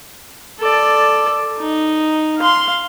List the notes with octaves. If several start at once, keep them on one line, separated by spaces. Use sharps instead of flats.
A4 D5
D#4
F5 C6